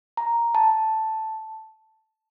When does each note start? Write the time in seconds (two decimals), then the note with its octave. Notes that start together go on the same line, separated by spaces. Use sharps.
0.17 A#5
0.55 A5